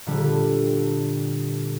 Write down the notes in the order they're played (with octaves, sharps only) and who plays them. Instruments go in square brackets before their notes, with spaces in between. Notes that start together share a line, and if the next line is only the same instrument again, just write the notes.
[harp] A#2 D3 G3